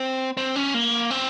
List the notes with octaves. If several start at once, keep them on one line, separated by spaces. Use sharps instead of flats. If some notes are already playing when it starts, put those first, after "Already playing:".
Already playing: C4
C4
C#4
A#3
C4